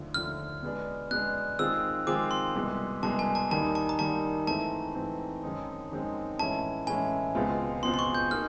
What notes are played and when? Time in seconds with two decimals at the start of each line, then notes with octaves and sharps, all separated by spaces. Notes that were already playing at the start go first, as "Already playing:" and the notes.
Already playing: D#2 D3 F3 A3
0.14 D#2 D3 F3 A3 F6
0.63 B2 G#3 B3 D4
1.11 B2 G#3 B3 D4 F#6
1.59 D#3 G#3 C4 F4 G#4 E6
2.07 D#3 G#3 C4 F4 G#4 D6
2.31 C6
2.55 C2 B2 G#3
3.03 C2 B2 G#3 A5
3.19 G#5
3.35 A5
3.51 D#2 D#3 G3 A#3 D#4 A5
3.75 A5
3.89 A#5
3.99 D#2 D#3 G3 A#3 D#4 A5
4.47 G#2 E3 A3 C4 A5
4.95 G#2 E3 A3 C4
5.43 F#2 D#3 G#3 C4 D#4
5.92 F#2 D#3 G#3 C4 D#4
6.39 A2 E3 G#3 C#4 E4 A5
6.87 A2 E3 G#3 C#4 E4 G#5
7.35 C#2 B2 G#3 C4 F4
7.83 C#2 B2 G#3 C4 F4 C6
7.94 C6
7.99 C#6
8.15 G6
8.31 A#3 D#4 F6